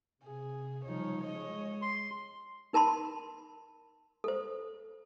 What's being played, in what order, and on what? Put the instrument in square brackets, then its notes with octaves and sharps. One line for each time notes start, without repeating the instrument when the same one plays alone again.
[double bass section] C3 [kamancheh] G#4
[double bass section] C#3 F3 G3 [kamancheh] D#4 C#5
[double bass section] G#3 [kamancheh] C#5 D#5
[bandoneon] C6
[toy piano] D#4 A#4 A5 B5 C6
A4 C5